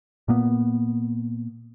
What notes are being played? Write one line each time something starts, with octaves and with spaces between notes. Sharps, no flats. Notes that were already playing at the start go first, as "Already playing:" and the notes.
A#2 A#3 B3